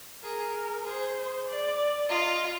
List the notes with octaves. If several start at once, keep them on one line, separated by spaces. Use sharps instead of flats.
G#4 A#4
G#4 C5
D5
F4 D#5